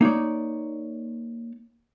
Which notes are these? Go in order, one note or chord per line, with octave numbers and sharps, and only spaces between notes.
A#3 D#4 C#5 D5